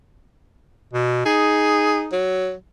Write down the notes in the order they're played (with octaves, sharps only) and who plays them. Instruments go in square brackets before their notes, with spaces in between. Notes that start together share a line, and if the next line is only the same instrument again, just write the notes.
[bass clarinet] B2
[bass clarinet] D#4 [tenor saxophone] G#4
[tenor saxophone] F#3